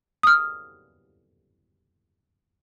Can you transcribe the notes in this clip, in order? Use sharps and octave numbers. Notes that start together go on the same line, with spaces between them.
D#6 F6